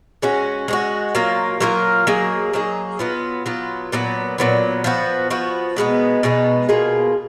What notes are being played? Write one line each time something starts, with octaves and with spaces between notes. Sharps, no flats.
G#3 C#4 F#4
G#3 C#4 F#4
F#3 A#3 F4 A#4
F#3 A#3 F4 A#4
F#3 A#3 D#4 G#4
F#3 A#3 D#4 G#4
F#3 B3 F4
F#3 B3 F4
A#2 F#3 B3
A#2 F#3 B3
F3 B3 F#4
F3 B3 F#4
B2 G#3 B3 D#4
B2 G#3 B3 D#4
B2 A#3 F4 G#4